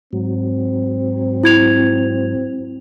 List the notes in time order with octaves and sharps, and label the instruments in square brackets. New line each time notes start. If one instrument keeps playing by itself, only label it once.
[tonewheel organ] G#2 F#3 [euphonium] C4
[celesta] E4 G#6 F7